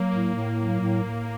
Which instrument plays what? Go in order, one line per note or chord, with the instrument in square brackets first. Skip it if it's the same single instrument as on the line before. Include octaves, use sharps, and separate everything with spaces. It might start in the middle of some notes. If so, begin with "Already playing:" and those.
Already playing: [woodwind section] F#3 [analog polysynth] A#3
[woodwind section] A2 [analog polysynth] A#3
[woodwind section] A2
F#3
A2
A2